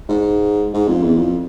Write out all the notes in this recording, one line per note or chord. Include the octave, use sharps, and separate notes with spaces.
G#2
G#2
F2
E2
F2